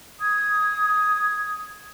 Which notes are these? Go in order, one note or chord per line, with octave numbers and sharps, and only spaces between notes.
D#6 G#6